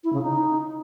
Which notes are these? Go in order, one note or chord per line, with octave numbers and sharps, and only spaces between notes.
E4
C#3
D#4